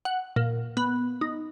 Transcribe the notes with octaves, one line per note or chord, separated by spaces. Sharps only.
F#5
A#2
B3
D#4